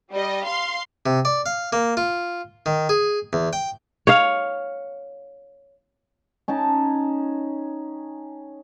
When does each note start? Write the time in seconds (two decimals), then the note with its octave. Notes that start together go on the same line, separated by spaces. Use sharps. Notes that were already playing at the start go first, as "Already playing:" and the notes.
0.12 G3 D#5
0.45 F5 C6
1.06 C3
1.25 D5
1.46 F5
1.73 A#3
1.97 F4
2.66 D#3
2.89 G#4
3.33 E2
3.53 G5
4.07 C#5 F5
6.48 C#4 D#4 G5 A5